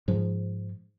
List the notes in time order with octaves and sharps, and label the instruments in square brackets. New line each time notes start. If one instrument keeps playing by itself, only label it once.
[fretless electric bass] G#2 F3